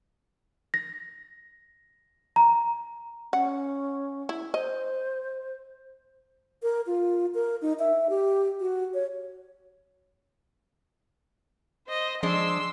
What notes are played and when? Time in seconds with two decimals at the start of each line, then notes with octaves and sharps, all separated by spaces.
0.74 A#6
2.36 A#5
3.33 C#4 F#5
4.29 E4
4.54 C5 D#5
6.63 A#4
6.86 F4
7.34 A#4
7.62 D#4
7.79 E5
8.09 G4
8.60 F#4
8.94 C#5
11.88 C5 D#5
12.23 F3 G#3 D4 C6 E6